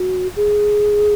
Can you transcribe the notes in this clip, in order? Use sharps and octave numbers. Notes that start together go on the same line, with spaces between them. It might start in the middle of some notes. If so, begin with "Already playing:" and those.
Already playing: F#4
G#4